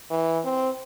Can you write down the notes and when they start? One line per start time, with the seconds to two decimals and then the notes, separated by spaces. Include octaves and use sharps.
0.11 E3
0.44 C4